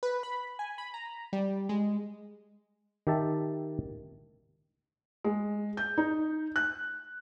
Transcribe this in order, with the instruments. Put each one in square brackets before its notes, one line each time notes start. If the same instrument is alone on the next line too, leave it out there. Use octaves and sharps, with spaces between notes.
[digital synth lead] B4
B5
G#5
B5
A#5
G3
G#3
[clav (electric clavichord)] D#3 G4 E5 A5
[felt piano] G#3
G6
D#4
F#6